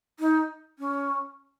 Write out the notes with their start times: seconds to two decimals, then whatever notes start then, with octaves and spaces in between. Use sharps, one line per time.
0.20 D#4
0.79 C#4